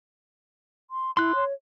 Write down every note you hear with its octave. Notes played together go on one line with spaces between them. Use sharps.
C6
E4 C6 F#6
C#5